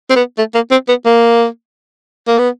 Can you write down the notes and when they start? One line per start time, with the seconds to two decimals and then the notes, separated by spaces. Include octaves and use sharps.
0.10 C4
0.16 B3
0.38 A3
0.54 A#3
0.71 C4
0.88 B3
1.05 A#3
2.27 A#3
2.39 B3